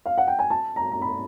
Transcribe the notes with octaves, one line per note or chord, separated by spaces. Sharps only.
F5
F#5
G5
G#5
A5
A#5
A#5
B5